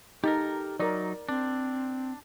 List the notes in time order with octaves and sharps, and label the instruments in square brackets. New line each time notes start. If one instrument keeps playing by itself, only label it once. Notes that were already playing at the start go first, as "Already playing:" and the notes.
[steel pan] D#4 [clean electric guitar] G4 A4 A#4
[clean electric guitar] F#3 D#4 [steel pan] A#4 D5
[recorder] C4 [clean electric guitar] D4